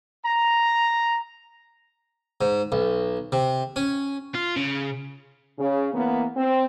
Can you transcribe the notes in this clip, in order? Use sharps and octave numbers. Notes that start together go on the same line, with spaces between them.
A#5
G#2
B1
C3
C#4
F4
C#3
C#3
E3 A#3 B3
C4